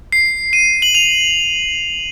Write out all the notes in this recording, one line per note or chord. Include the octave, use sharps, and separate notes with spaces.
C7
D#7
F#7
F7